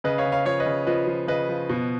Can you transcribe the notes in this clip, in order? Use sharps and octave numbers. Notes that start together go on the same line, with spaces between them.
C#3 B4 D#5
C#5 F5
C#3
C#5 F5
F3 C#5 F5
B4 D#5
C#3
F3 B4 D#5
F3
C#3 B4 D#5
F3
B2